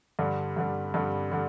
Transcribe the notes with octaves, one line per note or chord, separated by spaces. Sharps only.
G2 D3 G3
G2 D3 G3
G2 D3 G3
D3 G3